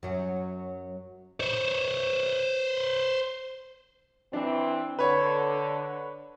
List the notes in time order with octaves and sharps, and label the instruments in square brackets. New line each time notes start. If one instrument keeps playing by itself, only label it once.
[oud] F#2 F#3
[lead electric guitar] C5 C#5
[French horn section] E3 C4 [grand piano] D4
[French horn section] D3 [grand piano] B4 C#5